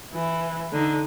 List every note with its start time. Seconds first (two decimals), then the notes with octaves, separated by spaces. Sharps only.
0.14 E3
0.72 D3 D#4